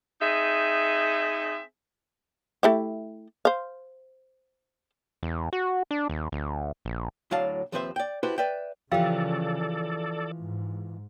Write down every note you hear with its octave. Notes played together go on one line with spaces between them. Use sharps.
C4 D#4 G#4 E5
A3 E4 G4
C5 F5
E2
F#4
D4
D#2
D2
A#1
D2 A2 F#3 D4 F5 A5
D#2 F3 C4 B4 C5 E5
D5 G5
D4 E4 F#4 G4 B4 C5
B4 D5 E5 G5
C#3 E3 F3 G4 A4 D5 F5 G5
G#2